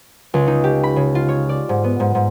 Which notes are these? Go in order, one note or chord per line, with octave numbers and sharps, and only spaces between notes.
C#2
D#4
G4
B5
C#3
F4
C#5
D5
G#2
B3
G#2
G#2